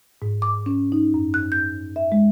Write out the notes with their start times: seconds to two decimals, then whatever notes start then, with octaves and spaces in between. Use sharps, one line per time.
0.22 G#2
0.42 D6
0.66 C#4
0.92 D#4
1.14 F#2
1.34 F#6
1.52 G6
1.96 E5
2.12 G#3